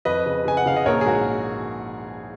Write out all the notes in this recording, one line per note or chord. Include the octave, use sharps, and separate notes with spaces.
F2 B4 D#5
C#3
C#3 G#5
F#5
C#3 F5
D#5
A#1 A#4 C#5
G#4
G#2 F#4 A#4